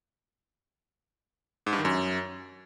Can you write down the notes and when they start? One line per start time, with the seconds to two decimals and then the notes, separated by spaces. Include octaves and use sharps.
1.66 G#2
1.73 G2
1.79 D#3
1.85 F#2